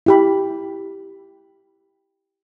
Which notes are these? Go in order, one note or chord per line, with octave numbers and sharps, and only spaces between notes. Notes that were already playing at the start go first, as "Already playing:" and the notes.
E4 G4 B5